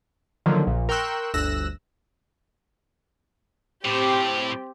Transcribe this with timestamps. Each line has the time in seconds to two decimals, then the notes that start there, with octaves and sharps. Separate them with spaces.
0.46 D3 D#3 F3 F#3 A#3
0.67 A#1 A#2
0.89 A#4 G5 C6 C#6 E6 F#6
1.34 G1 D2 E6 F#6 A#6
3.85 A2 C4 G4